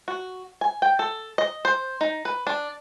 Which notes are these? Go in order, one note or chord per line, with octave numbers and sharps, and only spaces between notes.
F#4
G#5
G5
A4
D#5
C5
D#4
B4
D4